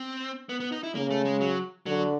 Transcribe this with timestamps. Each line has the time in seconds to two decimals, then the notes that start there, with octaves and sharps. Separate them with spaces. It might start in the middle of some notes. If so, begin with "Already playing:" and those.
Already playing: C4
0.49 B3
0.60 B3
0.72 D#4
0.83 E4
0.95 C#3 A#3
1.10 A3
1.25 G#3
1.41 F#3
1.86 D3 F#3